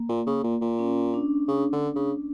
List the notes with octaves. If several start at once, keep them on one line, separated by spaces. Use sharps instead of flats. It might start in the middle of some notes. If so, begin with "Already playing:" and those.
Already playing: A#3
A#2
C#3
A#2
A#2
C#4
D4
C#3
D3
C#3